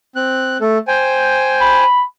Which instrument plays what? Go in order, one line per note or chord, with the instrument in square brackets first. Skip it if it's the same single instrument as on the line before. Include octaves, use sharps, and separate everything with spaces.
[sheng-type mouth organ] C4 F#6
A3 A4
C5 G5 G#5
[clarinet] B5